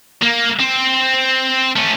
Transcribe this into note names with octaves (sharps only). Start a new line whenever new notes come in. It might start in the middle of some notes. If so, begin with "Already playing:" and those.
A#3
C4
A3 C#4